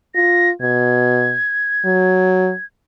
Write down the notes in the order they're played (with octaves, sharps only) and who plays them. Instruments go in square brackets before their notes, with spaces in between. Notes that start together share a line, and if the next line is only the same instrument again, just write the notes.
[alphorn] F4 [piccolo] A#6
[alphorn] B2 [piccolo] G#6
[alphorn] F#3